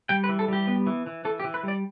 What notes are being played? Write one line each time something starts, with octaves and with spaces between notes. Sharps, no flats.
G3 G5
B4
E3
A4
G3 G4
B3
E3
E3
E3 A4
G4
E3
B4
G3 D5